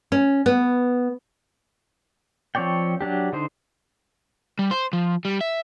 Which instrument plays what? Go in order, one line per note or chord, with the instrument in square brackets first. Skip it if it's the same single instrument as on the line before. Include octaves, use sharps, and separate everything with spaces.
[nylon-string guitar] C#4
B3
[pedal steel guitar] F3 C4 C#5 D5 G5
F#3 D4 G4
D3 D#4 C5
[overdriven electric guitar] G3
C5
F3
G3
E5